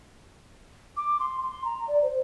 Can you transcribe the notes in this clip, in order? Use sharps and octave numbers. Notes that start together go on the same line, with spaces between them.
D6
C6
C6
A#5
D5
C5